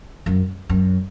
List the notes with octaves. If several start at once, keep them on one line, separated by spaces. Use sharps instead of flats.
F#2
F#2